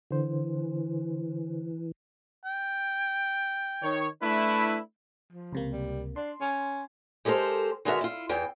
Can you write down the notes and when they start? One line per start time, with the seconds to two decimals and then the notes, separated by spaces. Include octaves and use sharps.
0.11 D3 E3 C5
2.45 G5
3.83 D#3 C#5
4.22 A3 D4 E4 B4
5.32 F3
5.53 C#2 C3 A#3
5.72 G3
6.16 D4 C6
6.41 C#4
7.25 G#3 G4 A4 A#4 C5
7.85 D3 G#3 B3 F#4 A#4 E5
8.01 E4 F4
8.29 E2 E3 G5